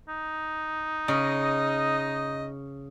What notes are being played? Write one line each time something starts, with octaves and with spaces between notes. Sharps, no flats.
D#4
C#3 D#5